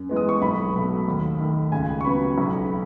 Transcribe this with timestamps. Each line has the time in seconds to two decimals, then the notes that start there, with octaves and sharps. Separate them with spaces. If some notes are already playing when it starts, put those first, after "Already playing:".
Already playing: F#2
0.09 E3 G#3 B3
0.16 D#6
0.29 C#6
0.42 B1 B5
0.75 B2 F#3 A3
1.08 D#2
1.40 D#3 A3
1.72 C#2 G#5
2.01 C#6
2.05 C#3 F#3 B3 B5
2.38 B1